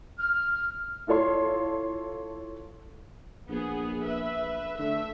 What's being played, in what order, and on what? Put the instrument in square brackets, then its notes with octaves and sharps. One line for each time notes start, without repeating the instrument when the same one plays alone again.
[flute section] F6
[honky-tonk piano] E4 F4 A4 C#5 C6
[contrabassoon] A#1 [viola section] B3 G#4
[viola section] B4 E5
[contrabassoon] D3 [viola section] A3 E5